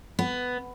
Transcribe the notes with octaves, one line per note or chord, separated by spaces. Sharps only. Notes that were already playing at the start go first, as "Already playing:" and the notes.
B3